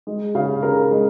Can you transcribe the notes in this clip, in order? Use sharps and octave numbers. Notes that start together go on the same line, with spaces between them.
G#3
C#3 F5
C#3 A#4
G#3